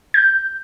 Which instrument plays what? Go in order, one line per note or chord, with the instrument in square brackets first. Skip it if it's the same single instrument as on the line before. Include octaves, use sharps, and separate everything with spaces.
[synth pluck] G6